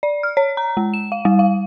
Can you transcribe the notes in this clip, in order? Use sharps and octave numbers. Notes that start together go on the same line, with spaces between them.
D5
F6
C#5
A#5
G#3
E7
F5
G3
F5